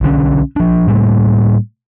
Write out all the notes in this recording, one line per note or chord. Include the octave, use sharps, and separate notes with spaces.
B1 D3 C#4
F3 D4
A2 G3 A3 A#3